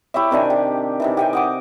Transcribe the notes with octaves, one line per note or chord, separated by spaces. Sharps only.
E4 G4 C#5 E5
C3 D#3 D4 G#5
G4
C3 D#3 E3
G4 G5 G#5
D#5 F#5 D6